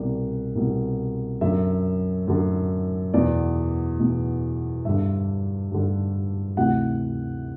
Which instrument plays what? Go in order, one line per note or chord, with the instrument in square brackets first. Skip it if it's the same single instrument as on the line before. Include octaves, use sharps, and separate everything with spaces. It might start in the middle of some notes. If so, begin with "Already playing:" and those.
Already playing: [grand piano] C2 B2 D5
C2 B2
F#2 D3 E5
F#2 D3
E2 B2 D5
E2 B2
G2 D3 E5
G2 D3
D2 C3 E3 F#5